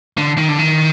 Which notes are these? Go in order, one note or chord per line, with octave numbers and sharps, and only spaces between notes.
D3
D#3
D3
D#3